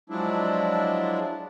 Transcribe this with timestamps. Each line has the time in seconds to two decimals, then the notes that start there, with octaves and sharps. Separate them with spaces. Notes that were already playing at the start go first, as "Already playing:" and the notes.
0.10 F3 F#3 G#3 D4 E4